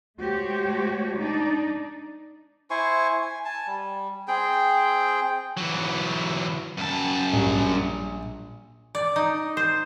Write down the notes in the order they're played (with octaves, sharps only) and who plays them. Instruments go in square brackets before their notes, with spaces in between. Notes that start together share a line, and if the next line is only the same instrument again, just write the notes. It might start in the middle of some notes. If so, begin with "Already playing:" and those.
[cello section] G#3 A3 F#4 G4 C5 C#5
D4 D#4 D5
[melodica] E4 C5 G#5 C#6
G#5
G#5 A5
G3
C4 G#4 G5
[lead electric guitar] E3 F#3
F#2 A5
[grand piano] A#1 G3
[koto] D5
D#4
C5